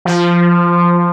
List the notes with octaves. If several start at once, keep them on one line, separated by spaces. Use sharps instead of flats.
F3